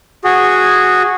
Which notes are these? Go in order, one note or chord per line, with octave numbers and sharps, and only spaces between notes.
F#4 G#4